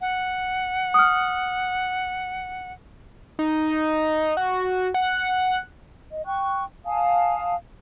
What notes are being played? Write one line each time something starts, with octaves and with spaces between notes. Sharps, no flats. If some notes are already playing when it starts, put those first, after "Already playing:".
F#5
D#6 F6
D#4
F#4
F#5
D#5
G5 C#6 F#6
F5 G#5 A5 D#6